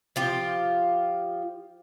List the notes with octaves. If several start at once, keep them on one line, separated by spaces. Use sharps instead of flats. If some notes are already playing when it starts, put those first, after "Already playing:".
F3 F4 G4